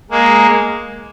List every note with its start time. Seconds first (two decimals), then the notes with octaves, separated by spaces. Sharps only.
0.11 G#3 A#3